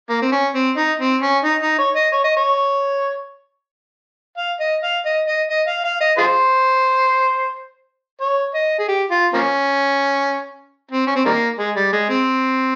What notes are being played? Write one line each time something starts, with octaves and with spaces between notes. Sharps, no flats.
A#3
C4
C#4
C4
D#4
C4
C#4
D#4
D#4
C#5
D#5
C#5
D#5
C#5
F5
D#5
F5
D#5
D#5
D#5
F5
F5
D#5
F4 G#4 C5
C#5
D#5
G#4
G4
F4
F3 A#3 C#4
C4
C#4
C4
D#3 G3 A#3
G#3
G3
G#3
C4